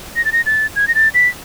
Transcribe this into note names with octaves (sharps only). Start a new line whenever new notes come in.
A#6
A6
A#6
A6
G#6
A#6
A6
B6